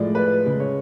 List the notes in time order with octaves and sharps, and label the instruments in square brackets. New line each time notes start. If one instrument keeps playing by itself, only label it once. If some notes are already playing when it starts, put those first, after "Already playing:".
Already playing: [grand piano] A2 F3 G#3 D5
B4
C#3 G#3
C#5